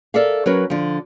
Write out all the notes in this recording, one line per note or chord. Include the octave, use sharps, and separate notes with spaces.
A4 A#4 D5 E5 F5
F#3 C#4 A#4 B4
D3 F3